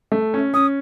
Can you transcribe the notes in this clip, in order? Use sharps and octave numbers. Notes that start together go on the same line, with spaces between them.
A3
C#4
C#4 D#6